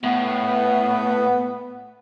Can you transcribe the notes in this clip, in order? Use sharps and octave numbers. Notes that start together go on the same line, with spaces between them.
A2 B3